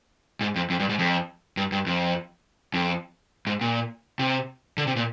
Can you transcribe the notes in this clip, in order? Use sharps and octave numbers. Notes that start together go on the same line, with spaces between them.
G#2
F2
F2
G2
G#2
F2
G2
G2
F2
F2
G#2
A#2
C3
D3
C3
A#2